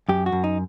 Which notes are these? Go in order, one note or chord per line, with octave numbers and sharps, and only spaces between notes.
F#2 G4
F#4
F#2
D#4